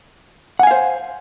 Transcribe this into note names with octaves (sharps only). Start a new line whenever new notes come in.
C5 F5 F#5 G#5